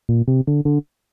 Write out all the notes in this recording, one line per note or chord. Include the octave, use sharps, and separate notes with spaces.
A#2
C3
D3
D3